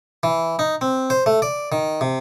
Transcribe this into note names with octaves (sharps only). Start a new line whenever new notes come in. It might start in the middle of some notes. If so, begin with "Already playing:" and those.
E3
D#4
C4
C5
A3
D5
D#3
C3